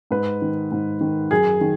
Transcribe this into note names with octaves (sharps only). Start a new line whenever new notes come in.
G#2 B4
D#3
G#2
D#3
F#2 G#4
D#3